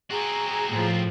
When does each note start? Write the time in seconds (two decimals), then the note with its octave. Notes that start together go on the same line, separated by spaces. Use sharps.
0.10 C4 F#4 G#4 A#5
0.69 A2 F3